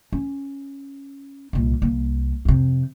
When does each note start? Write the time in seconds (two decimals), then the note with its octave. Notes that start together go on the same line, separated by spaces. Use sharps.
0.12 C#4
1.53 C2 A#2
1.82 C2 A#3
2.45 F2 C3